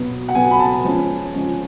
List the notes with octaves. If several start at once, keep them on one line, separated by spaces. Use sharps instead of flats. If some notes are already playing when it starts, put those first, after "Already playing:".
Already playing: B2 F#3 B3
F#5
B2 F#3 B3 G#5
B5
A5
F3 G#3 C#4
F3 G#3 C#4